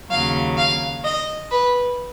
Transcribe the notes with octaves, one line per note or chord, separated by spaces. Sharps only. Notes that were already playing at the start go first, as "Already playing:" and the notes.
D#2 C#3 F#3 F5
F5
D#5
B4